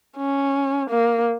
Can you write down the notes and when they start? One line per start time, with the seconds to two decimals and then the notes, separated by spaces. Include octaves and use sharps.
0.17 C#4
0.90 A#3